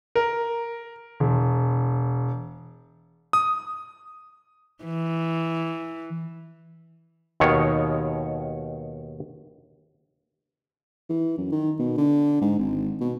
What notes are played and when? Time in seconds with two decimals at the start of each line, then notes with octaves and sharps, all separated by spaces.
0.15 A#4
1.20 E1
3.33 D#6
4.84 E3
7.40 D#2 B2 D#3 C#5
11.09 E3
11.38 F#2
11.52 D#3
11.79 B2
11.98 D3
12.41 G#2
12.59 G#1
13.01 B2